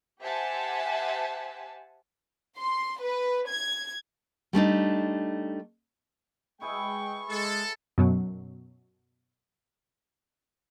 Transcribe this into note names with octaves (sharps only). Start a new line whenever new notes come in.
G4 C5 E5 F#5 G#5 A5
C6
B4
G#6
G3 A3 D4 D#4
G#3 E4 G#4 B4 G5 C#6
G#3 A4
F#2 B2 F#3